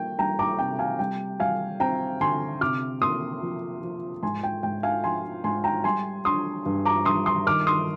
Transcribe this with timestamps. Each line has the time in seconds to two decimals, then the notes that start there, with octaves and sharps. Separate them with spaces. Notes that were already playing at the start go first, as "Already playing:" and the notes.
Already playing: G3 A#3 G5
0.19 G3 G5 A#5
0.39 A#5 D6
0.59 C3 G5
0.79 F5 G#5
0.99 G3 G5
1.40 G3 F5 G#5
1.80 C4 G5 A#5
2.20 D3 G#5 C6
2.61 C3 D6 F6
3.01 A#3 C6 D#6
3.42 F3
3.83 F3
4.23 G#2 G#5 C6
4.44 G5
4.63 G#2 G5
4.83 F5 G#5
5.04 F3 G#5 C6
5.44 G#2 G#5 C6
5.64 G5 A#5
5.84 G3 G#5 C6
6.25 D4 C6 D#6
6.66 G2
6.86 A#5 D6
7.05 G2 C6 D#6
7.26 C6 D#6
7.46 D#3 D6 F6
7.67 C6 D#6